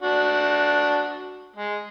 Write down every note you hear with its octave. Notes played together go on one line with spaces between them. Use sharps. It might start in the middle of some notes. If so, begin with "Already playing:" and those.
D4 F#4
G#3